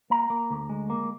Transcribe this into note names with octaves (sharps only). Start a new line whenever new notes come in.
A#3 A#5
A#3
D2
G#3
A#3